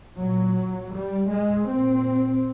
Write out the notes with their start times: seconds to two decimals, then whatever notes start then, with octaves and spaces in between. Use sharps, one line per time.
0.17 A#2 F#3
0.92 G3
1.30 G#3
1.68 A#2 C4